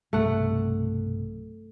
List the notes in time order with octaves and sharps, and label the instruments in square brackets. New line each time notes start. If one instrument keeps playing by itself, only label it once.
[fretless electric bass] B1 G2 C3 [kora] A3 F#5